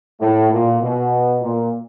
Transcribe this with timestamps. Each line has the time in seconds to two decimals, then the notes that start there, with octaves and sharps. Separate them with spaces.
0.21 A2
0.52 A#2
0.81 B2
1.42 A#2